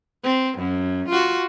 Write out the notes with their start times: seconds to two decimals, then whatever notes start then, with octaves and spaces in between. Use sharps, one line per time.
0.24 C4
0.58 F#2
1.09 F4 F#4